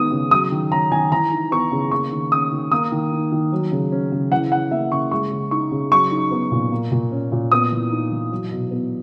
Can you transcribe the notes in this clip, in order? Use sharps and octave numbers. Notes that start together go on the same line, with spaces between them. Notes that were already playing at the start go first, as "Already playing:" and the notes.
Already playing: D#3 G#3 B3 D#4 D#6
C#3
F#3 D#6
D#3
C#4 A#5
D#3 G#5
E3 A#5
D#4
B3 C#6
C#3
A#3 C#6
D#3
C#4 D#6
D#3
A#3 D#6
D#3
D#4
D#3
F#3
C#3
C#4
C#3
E3 F#5
C#4 F#5
A#3 E5
C#3 C#6
G#3 C#6
C#3
D#4 C#6
C#3
F#3 C#6
D#4
B3
A#2
A#3
A#2
C#4
A#2
B3 D#6
E3
D#4
E3
F#3
B2
B3